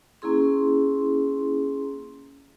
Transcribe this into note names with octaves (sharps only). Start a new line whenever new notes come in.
A#3 C#4 E4 G#4 C6